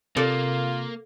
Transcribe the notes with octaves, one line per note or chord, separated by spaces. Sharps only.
C3 A#3 F4 A4 D5